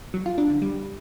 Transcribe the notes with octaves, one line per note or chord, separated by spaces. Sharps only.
F#3
F4
D4
D3
G3